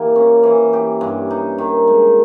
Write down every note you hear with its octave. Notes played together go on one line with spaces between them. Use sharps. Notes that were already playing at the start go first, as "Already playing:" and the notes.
Already playing: E3 A#3 G4
C#4
E3
G4
G2
D#4
D#3
G#3